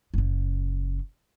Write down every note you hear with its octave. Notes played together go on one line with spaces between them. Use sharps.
F#1 C#3